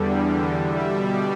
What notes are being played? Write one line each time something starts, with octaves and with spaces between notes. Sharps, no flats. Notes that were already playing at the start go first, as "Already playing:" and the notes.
Already playing: E2 D3 G3
B2 G3 E5
D5